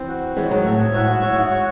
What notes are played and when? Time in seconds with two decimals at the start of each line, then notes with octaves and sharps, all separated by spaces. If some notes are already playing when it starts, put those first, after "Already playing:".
Already playing: E3 C4
0.08 F#4
0.36 E3 G#3 C#5
0.50 D#3 F#3
0.65 A2 E5
0.80 G#2
0.94 A2 F#4
1.07 G#2
1.22 F#2 C#5
1.36 G#2
1.51 C#5